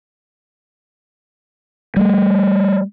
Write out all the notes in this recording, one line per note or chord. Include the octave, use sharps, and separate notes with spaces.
G3 A3